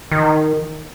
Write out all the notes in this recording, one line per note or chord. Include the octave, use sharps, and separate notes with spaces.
D#3